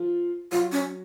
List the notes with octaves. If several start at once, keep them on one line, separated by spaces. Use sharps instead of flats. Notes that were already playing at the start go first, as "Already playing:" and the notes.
Already playing: F3 F4
F#3 F4 F#4
C#4